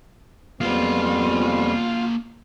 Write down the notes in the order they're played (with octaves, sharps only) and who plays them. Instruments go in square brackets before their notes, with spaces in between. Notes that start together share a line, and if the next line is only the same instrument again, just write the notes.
[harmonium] F2 G3 [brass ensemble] F3 B3 [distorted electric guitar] A#3 G#4 [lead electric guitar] F4